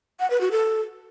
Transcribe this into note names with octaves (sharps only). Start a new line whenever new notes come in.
F#5
B4
F#4
A4